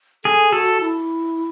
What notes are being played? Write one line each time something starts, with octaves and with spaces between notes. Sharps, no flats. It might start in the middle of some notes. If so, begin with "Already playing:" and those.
G#4 A4
F#4 A4
E4